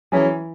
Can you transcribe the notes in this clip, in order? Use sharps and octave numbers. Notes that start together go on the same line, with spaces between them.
E3 F#3 C#4 G#4